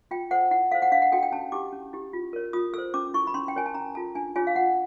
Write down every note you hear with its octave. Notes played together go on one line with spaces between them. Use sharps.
F4 G5
A4 C5 F#5
E4 F#5
A4 C5 F5
F#5
D4 F5
F#5
F#4 A4 G5
G5
C#4 A5
E4 G4 D6
C#4
E4 G4
F4
A#4 C#5
F4 D#6
A4 C5 E6
C#4 D6
E4 A4 C#6
B5
C#4 C6
G5
F#4 A#4 C#5 G#5
A5
C#4 A#5
F4 A4 A5
D4 G#5
F4 G#4 C#5 G#5
F5
F4 F#5